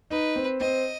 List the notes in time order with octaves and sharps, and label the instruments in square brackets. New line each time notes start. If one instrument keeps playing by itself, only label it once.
[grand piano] D#4 [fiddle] B4
[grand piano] C4
[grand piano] C4 [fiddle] D#5